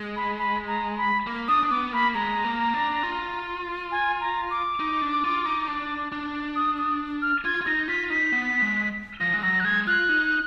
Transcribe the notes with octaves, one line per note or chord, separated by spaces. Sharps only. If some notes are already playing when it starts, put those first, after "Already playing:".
Already playing: G#3
B5
B5
A#5
B5
A#3
D4 D#6
D4
B3 D6
A#3 B5
G#3 A#5
A#3
D4
F4
G#5
A#5
D6
D#4
D4
F4
D#4
D4
D4
D#6
D#6
F6
F4 G#6
F4
D#4 A#6
F4 B6
D#4 B6
B3
G#3
F3 A#6
G#3
F#3 A#6
F#6
G#3 G#6
F4 F#6
D#4